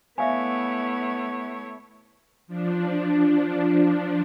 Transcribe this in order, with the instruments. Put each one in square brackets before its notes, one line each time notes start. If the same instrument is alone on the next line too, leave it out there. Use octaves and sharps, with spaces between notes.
[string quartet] A3 E4 C#5 [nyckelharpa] B3 [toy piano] E5 F5 G#5
[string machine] F3 D4